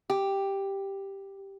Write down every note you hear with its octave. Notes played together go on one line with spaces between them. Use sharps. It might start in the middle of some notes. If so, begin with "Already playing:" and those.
G4